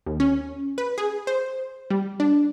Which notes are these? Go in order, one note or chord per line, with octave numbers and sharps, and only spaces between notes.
D#2
C#4
B4
G#4
C5
G3
D4